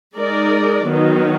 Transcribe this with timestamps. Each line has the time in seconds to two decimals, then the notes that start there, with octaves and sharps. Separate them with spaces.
0.17 G#3 D#4 A#4 D5
0.86 D#3 F#3 B3 D#4